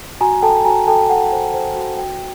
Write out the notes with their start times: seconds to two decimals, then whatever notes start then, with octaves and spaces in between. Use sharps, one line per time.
0.21 F#4 G#5 A#5
0.42 A4 G5 A5
0.65 F#4 G#5 A#5
0.87 A4 G5 A5
1.09 A4 F#5
1.32 C5
1.54 C5
1.76 F#4
1.98 F#4 G5